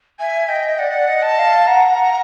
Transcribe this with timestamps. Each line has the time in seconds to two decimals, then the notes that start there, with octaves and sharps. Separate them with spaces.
0.19 E5 G#5
0.48 D#5 G5
0.79 D5 F#5
1.08 D#5
1.23 A5
1.38 F5
1.67 F#5 A#5
1.90 F#5